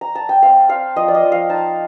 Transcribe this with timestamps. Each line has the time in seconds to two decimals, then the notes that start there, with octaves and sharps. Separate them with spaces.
0.01 A#5
0.15 A5
0.29 G5
0.43 C4 F5
0.69 C4 F5
0.96 F3 D#5
1.08 D5
1.15 D#5
1.23 F3
1.32 F5
1.49 D#4 A5